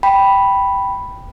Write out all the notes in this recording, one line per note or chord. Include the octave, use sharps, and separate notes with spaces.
G5 B5